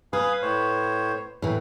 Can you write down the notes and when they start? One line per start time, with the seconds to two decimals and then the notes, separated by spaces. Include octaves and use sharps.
0.13 B4 F5 G#5 D#6
0.42 A2 C5 C#5
1.42 A2 E3